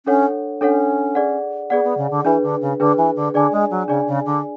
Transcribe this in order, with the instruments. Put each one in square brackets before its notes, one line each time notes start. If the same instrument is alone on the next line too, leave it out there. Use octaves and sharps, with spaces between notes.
[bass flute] C#4 [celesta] D4 A4 C#5 F#5
[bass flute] C#4 [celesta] D4 A4 C#5 F#5
[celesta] G#4 D5 F#5
[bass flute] B3 [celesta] G#4 D5 F#5
[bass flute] B3
C#3
D3
[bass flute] E3 [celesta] D4 G#4 B4
[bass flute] D3
C#3
[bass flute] D3 [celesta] D4 G#4 B4
[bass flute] E3
D3
[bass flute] D3 [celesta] D4 G#4 D5 G#5
[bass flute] G#3
F#3
[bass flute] C#3 [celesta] D4 G#4 D5 G#5
[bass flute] C#3
D3